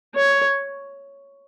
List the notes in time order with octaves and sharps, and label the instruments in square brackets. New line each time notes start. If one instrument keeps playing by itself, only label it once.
[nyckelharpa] C#5